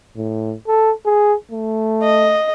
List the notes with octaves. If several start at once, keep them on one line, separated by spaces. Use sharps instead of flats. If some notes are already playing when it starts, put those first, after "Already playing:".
A2
A4
G#4
A3
D#5